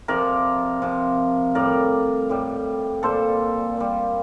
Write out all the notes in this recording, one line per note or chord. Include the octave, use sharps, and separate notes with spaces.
C3 F3 A#4 D5
C3 F3
A2 G3 A#4 D5
A2 G3
A#2 G3 A4 C5
A#2 G3